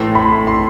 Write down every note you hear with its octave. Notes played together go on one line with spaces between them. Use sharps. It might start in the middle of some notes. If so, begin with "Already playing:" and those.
Already playing: A2 E3 A3 C6
B5
C6